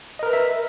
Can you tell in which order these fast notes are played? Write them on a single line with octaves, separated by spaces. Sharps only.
D#5 A#4 B4 A#5 E5